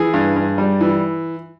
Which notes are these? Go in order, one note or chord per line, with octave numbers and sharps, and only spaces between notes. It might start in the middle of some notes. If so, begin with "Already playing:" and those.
Already playing: E3 G#4
G2
G2
G3
E3